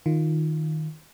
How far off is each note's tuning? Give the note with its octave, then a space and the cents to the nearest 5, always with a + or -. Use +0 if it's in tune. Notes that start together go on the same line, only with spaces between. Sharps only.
D#3 +0 F4 +0